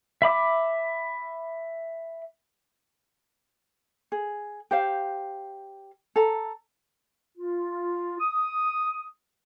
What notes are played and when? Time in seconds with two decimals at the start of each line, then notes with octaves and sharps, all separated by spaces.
0.22 E5 B5 D6
4.12 G#4
4.71 G4 C5 F5
6.16 A4 A#5
7.38 F4
8.20 D#6